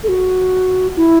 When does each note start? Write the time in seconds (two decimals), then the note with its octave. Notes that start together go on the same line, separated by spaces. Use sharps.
0.04 A4
0.09 F#4
0.97 E4